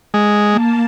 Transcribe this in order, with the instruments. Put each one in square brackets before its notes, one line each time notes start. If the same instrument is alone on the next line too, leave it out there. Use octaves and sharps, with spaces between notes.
[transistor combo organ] G#3
[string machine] A#3 A5